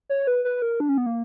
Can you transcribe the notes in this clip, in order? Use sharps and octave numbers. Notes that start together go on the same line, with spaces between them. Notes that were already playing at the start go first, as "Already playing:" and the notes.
C#5
B4
B4
A#4
D4
C#4
B3
A#3